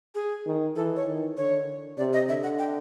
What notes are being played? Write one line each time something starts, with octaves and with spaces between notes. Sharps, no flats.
G#4
D#3
E3 A4
C#5
D#3
D3 C#5
C3 D5
D#5
D3 E5
F#5
G5